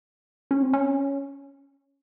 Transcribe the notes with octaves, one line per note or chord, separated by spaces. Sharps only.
C#4
C4
C#4